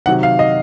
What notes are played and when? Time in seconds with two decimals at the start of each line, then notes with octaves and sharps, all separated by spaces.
0.06 C3 D#3 F#3 F#5
0.23 F5
0.39 D#5